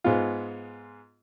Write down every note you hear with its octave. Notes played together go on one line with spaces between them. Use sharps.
G#2 G#3 B3 F4